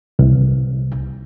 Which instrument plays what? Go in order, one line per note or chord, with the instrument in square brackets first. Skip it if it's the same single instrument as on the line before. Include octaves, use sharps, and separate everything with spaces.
[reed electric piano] C2